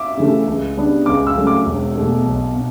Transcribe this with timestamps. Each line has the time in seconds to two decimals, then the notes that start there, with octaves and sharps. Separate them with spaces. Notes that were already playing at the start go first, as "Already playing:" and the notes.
Already playing: E5 D6
0.17 C#3 E3 A3
0.47 C#2
0.77 C#3 G3 B3 D4
1.06 C#2 D6
1.27 E6
1.36 C#3 F#3 A3
1.47 D6
1.66 E1
1.96 E2 B2 A3
2.25 B1
2.55 B2